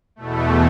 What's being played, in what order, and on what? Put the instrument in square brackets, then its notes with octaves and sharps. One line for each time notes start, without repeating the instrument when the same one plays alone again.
[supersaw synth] E2 B2 A3